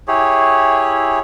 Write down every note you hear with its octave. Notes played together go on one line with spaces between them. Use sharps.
E4 G4 G#4 C#5